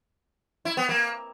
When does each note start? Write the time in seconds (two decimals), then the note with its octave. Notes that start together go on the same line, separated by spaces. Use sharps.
0.65 E4
0.77 B3
0.89 A#3